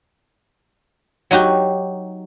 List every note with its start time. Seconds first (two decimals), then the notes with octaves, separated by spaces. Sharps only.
1.31 F#3 D#4 F#4 G4